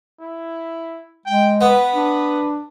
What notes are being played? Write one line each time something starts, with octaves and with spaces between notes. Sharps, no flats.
E4
G#3 G5
B3 B4
D4